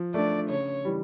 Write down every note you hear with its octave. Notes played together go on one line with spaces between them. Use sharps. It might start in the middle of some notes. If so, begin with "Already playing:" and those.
Already playing: F3
A3 D4 D5
C#3 C#5
E3 G3